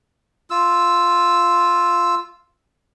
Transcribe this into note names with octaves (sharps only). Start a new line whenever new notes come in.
F4 E6